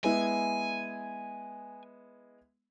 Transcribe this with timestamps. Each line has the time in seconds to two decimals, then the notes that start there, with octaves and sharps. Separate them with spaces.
0.04 G#3 B3 E4 G#5